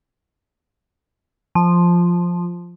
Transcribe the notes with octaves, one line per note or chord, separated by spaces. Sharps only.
F3